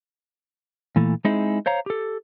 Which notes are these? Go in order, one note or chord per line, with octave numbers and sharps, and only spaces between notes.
A#2 E3 A3
G#3 C4 D#4 E4 G#4
C5 C#5 F5 A#5
G4 A4